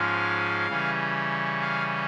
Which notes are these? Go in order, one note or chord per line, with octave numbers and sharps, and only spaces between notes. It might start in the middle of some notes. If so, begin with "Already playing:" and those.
Already playing: G#2 F3 G#3 C#4 F5
C#3 E3 G3 C#4
F5